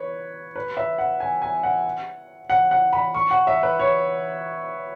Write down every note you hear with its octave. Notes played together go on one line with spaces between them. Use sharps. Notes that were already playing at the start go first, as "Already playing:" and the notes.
Already playing: B4 C#5
B4
E5
F#5
G#5
G#5
F#5
F#5
F#5
B5
C#6
F#5
E5
B4
C#5